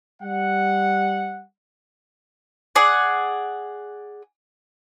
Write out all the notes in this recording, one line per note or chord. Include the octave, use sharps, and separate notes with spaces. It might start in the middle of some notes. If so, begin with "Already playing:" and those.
G3 F#5
G#4 D5 F#5